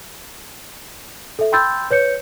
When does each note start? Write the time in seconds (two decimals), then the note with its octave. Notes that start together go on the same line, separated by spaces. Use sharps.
1.39 A4 E5
1.52 G5 B5 C6 E6 G6 A6
1.91 B4 C#5 G6 C#7